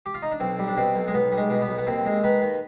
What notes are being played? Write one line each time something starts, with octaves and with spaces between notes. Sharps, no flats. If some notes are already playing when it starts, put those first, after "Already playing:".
G4
F4
D#4
D4
B1 C4
G3
D4
B2 C4
B1
G#3
B1 B3
G3
G#3
B2
B3
B1
B3
D#2 C4
G#3
D#3 B4
D#2